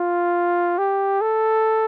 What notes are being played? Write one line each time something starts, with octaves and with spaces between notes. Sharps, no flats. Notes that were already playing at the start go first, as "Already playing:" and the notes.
Already playing: F4
G4
A4